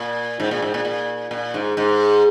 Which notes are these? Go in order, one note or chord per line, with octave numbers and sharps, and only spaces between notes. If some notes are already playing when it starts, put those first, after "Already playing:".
Already playing: A#2
G#2
A#2
G#2
A#2
A#2
A#2
G#2
G#2